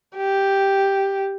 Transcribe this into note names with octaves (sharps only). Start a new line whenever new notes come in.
G4